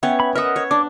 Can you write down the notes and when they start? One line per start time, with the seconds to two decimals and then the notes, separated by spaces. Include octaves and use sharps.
0.03 B3 C#4 C#5 E5 F#5 G5
0.20 B5
0.35 A#4 B4 D#5 E5 F#5 D#6
0.56 C#5
0.71 D4 D6